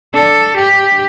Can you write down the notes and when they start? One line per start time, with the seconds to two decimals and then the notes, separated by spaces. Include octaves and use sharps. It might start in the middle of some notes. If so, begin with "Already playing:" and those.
0.14 D4 A4
0.57 G4